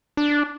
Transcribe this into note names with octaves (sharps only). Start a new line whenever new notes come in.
D4